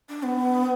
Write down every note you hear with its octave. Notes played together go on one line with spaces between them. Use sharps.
D4
B3